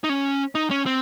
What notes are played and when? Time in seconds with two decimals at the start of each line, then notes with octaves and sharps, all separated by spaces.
0.04 D#4
0.09 C#4
0.55 D#4
0.71 C#4
0.86 C4